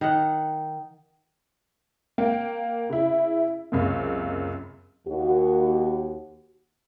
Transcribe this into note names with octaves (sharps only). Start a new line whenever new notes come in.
D#3 D#4 F#5
A#3 G5
C#3 E4
C#2 F#2 C3 A#3
D#2 F#4